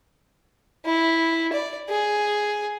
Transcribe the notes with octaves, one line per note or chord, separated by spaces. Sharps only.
E4
D5
G#4